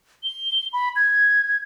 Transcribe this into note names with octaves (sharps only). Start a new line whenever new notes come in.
G7
B5
G#6